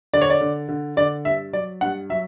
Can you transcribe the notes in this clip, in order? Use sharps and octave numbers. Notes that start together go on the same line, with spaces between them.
D3 D5
C#5
D5
D3
D3
D3 D5
G2 E5
F#3 D5
G2 F#5
F#3 E5